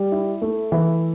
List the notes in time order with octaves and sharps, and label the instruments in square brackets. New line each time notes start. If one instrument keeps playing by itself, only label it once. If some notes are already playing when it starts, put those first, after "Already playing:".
Already playing: [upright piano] G3
E4
A3
E3